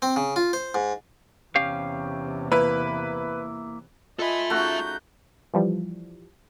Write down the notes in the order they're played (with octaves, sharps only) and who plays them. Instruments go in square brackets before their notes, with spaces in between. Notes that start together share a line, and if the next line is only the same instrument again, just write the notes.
[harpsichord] C4
C#3
F4
C5
G#2
[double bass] E2 C3 [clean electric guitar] C#4 G4 F5
[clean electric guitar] A#3 E4 [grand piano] B4
[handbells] F4 [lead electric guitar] A4 E5 [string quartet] D#5 G#5 B5
[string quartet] C#3 D#4 G6 [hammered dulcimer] A3 F#4
[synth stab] E3 F3 G3